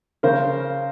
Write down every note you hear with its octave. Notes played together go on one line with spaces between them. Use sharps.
C#3 A#4 C5